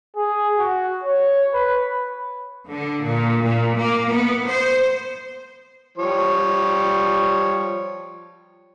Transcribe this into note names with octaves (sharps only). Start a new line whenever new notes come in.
G#4
F#4
C#5
B4
D3
A#2
A#2
A#3
B3
C5
F3 G3 C#5